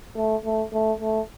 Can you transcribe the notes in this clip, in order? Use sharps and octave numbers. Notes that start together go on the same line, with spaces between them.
A3
A3
A3
A3